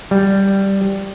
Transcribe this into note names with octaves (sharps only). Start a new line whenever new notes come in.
G3